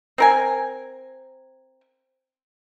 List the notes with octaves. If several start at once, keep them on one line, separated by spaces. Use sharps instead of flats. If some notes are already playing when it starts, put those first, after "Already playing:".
C4 A#4 G#5